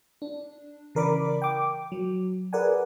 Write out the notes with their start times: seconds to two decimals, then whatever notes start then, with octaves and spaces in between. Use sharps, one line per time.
0.22 D4
0.95 C#3 E3 A#4 D5 B5 D6
1.42 G5 D6
1.57 D6
1.92 F#3
2.53 G#4 A#4 B4 D5 F#5 G#5